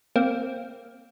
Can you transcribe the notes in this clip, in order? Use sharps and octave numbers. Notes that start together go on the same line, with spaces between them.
A#3 C4